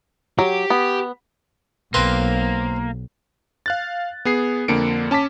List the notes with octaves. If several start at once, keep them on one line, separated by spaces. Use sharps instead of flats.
F#3 G4
B3
B1 A#3 C4 B4 C5
F5 F#6 A6
B3 G#4 C7
F2 D3 A#3 C#7 D7
C#4 A5 D6 B6